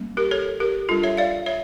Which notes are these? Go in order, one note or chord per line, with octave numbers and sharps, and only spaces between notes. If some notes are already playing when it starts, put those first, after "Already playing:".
Already playing: G3 A#3 C#4
G4 A#4
A4 C#5
G4 A#4
G3 D4 F4 A4
C#5 E5
D5 F5
C#5 E5